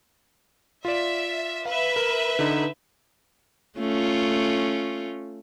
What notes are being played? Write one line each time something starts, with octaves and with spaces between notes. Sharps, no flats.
F4 D5 E5
B4 E5 F5
A#4
D3 D#4
A3 C#4 F4